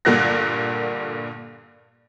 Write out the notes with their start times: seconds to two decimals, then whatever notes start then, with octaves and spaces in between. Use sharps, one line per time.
0.05 G2 A#2 D3 A#3 F#6 A#6